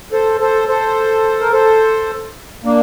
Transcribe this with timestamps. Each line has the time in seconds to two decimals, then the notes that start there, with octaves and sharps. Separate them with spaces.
0.12 A4 C5
0.40 A4 C5
0.68 A4 C5
1.41 A#4
1.52 A4 C5
2.64 A#3 D4